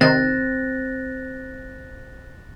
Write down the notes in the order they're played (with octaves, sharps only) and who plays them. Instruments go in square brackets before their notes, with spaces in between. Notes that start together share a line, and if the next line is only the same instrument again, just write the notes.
[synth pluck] C3 D#3 [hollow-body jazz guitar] C4 [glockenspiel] F#6 A6 A#6